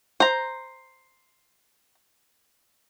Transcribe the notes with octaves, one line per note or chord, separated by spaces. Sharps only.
C5 A#5